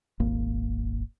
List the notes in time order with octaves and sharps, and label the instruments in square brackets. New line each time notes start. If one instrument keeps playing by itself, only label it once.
[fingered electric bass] D#1 G#1 A#3